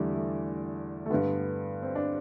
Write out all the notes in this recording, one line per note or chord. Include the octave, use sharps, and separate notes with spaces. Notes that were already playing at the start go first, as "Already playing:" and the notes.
Already playing: E2 D3 G3 A3
A3
A3
G2 D3 B3
C4
D4